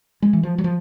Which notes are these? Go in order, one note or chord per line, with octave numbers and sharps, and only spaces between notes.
G#3
E3
F3
F#3
F3